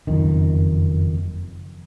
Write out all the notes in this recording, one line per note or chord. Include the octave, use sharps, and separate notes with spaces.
F#1 F2 D#3